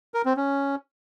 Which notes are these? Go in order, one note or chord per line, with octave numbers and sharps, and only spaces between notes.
A#4
C4
C#4